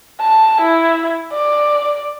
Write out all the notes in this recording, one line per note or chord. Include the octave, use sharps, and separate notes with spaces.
A5
E4
D5